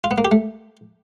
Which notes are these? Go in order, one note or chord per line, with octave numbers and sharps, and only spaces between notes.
F4
B3
A#3
G4
A3